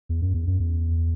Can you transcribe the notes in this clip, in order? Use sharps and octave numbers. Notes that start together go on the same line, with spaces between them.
E2
F#2
E2
F#2
E2